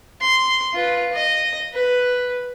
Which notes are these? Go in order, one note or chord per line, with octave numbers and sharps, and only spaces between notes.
C6
F4 B4
D#5
B4